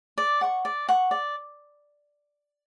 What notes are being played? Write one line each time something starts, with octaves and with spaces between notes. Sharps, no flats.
D5
F#5 C#6
D5
F#5 C#6
D5